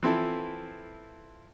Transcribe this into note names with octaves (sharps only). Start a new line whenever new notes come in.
E3 F3 C4 E4 A4